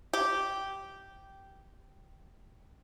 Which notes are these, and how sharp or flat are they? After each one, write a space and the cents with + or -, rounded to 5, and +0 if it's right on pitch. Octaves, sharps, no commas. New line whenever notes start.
G4 -10